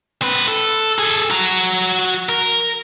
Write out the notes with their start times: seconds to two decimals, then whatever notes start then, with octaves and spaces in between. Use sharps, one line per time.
0.22 C4 B4
0.48 A4
0.99 G#4 A4
1.31 F#4 A#5
2.29 A#4